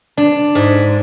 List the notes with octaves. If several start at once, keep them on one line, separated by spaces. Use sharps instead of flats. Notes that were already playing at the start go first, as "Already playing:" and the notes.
D4
G#2